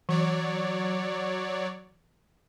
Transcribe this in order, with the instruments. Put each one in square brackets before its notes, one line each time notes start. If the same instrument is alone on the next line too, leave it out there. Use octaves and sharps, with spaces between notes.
[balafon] E3 [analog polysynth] F#3 C#5 D5